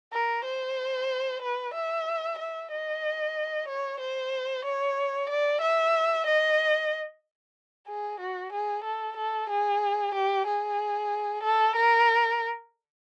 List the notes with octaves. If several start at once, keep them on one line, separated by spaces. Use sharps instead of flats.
A#4
C5
B4
E5
E5
D#5
C#5
C5
C#5
D5
E5
D#5
G#4
F#4
G#4
A4
A4
G#4
G4
G#4
A4
A#4